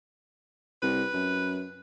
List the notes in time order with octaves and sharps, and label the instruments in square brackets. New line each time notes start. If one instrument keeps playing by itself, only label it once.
[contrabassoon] C2 [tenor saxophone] B4
[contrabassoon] F#2